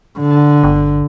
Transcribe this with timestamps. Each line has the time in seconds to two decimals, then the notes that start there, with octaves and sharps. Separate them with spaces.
0.19 D3
0.64 G1